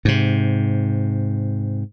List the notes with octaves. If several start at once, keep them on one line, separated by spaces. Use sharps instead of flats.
G#2 C3